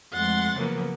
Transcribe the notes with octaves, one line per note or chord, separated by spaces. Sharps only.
F2 G#3 A3 F#5 C6 A6
C#3 F3 F#3 A#3 B3